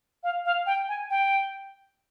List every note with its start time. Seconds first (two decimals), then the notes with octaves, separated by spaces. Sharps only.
0.23 F5
0.45 F5
0.66 G5
0.88 G#5
1.10 G5